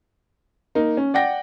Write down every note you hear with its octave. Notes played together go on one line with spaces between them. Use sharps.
A#3 D#4
C#4
D5 F#5 G5 A#6